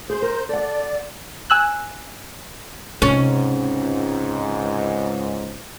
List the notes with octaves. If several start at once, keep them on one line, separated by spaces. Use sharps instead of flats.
G#4 C5 G6
A#4
A4 D5 F#5
G#5 E6 F#6
C#2 G#2 C3 C#4